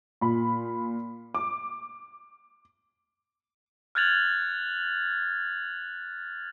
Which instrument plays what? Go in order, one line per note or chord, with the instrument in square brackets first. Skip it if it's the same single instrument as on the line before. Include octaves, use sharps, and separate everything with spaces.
[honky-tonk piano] A#2 B5
D6
[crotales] F6 F#6 G#6 A6 F7 F#7